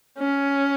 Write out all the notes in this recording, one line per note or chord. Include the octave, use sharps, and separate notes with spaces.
C#4